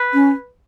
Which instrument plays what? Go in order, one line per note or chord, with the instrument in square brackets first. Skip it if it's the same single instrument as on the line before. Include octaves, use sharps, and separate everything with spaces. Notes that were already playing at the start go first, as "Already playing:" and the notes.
Already playing: [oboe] B4
[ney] C#4